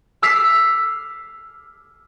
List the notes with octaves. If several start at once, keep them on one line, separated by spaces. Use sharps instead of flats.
D6 E6 F6 B6 C7